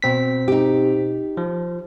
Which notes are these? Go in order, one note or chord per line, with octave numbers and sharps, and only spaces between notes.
B2 C4 B6
D#4 G4
F3